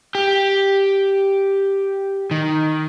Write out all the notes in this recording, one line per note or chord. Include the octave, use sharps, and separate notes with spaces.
G4
D#3